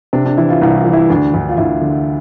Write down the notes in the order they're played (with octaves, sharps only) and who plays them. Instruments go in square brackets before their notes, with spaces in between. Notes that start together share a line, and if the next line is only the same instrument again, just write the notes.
[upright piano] C3 D4
D4
E3 E4
F4
C2
F4
E3
E4
D2 D4
D2
F4
D2 E4
D3